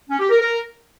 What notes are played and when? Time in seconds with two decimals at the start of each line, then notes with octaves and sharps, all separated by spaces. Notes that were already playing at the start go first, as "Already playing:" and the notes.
0.09 C#4
0.19 G4
0.30 A#4
0.40 A#4